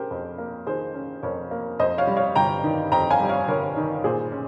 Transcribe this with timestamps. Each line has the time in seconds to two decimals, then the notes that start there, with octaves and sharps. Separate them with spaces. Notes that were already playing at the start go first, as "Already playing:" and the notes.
Already playing: C#4 G4 G#4 A#4 C5
0.11 F2
0.38 A#3
0.67 D#3 G#4 C5
0.94 C#4
1.23 F2 A#4 C#5
1.51 A#3
1.79 F2 C5 D#5
1.98 C#5 F5
2.07 G3
2.16 C#5 F5
2.35 G1 G5 A#5
2.64 D#3
2.91 F2 G5 A#5
3.10 F5 G#5
3.20 G3
3.29 C#5 F5
3.48 G1 A#4 C#5
3.76 D#3
4.04 A#2 G#4 C5
4.32 C#4